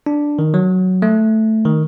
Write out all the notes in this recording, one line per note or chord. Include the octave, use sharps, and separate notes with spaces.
D4
D#3
F#3
A3
D#3